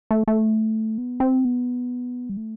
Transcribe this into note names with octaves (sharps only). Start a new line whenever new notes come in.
A3
A3
B3
C4
B3
G3
A3